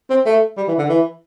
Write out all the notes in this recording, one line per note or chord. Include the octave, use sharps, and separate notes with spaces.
C4
A3
G3
E3
D3
E3